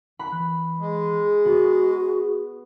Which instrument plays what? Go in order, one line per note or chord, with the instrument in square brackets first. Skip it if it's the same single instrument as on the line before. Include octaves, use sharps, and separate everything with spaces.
[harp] B5 [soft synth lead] F#6
[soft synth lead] E3
[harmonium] G#3
[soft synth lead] G#4
[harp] B3 [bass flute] F#4